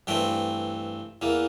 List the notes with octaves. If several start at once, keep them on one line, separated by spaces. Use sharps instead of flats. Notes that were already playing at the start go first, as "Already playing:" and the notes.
G2 E3 A3 C4 G5
E2 E3 A#3